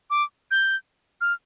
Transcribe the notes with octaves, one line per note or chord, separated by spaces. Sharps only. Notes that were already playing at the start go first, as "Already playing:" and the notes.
D6
G6
F6